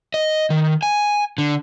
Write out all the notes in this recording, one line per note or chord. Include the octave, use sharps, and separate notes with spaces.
D#5
D#3
G#5
D3